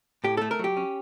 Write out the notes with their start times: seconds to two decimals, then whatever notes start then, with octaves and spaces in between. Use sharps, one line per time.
0.24 A2 G4
0.37 A3 A4
0.51 A#4
0.59 F#3 G4
0.77 C#4